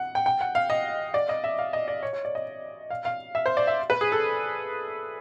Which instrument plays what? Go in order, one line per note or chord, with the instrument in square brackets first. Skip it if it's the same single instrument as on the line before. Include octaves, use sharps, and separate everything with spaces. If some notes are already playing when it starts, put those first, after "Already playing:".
Already playing: [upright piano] F#5
G5
G5
F#5
F5
D#5
D5
D#5
E5
F5
D#5
D5
C#5
C#5
D5
D#5
F5
F5
E5
C5
D5
E5
B4
G#4
A4